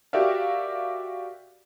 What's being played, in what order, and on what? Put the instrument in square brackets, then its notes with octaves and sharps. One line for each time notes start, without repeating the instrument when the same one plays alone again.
[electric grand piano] F#4 G4 A#4 D5 E5 F5